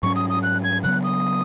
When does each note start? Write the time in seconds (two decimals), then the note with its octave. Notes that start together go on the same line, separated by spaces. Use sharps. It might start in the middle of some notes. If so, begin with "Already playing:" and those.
0.03 G#2 F#3 C#4 C#6
0.16 D#6
0.29 D#6
0.43 F#6
0.64 G#6
0.84 C#3 F#3 B3 F#6
1.04 D#6